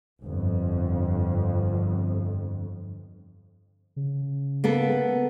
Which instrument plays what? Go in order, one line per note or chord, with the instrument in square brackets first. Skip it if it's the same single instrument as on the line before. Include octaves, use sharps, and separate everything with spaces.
[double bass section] G1 F2
[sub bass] C#3
[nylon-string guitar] A#3 B3 A4